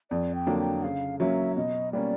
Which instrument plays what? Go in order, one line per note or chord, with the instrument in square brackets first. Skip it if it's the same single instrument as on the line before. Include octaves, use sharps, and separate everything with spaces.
[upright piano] F2 [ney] D5
[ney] G5
[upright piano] D3 F#3 A#3 D4
[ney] G5
[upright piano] C#3 [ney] F5
[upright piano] F#3 A#3 C#4 [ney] E5
[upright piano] B2 [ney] D#5
[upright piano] G3 A#3 C#4 [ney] D5